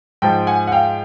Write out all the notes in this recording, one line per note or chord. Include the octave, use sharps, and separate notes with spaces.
G#2 F3 G5 A5
F#5 G#5
F#5
F5 G5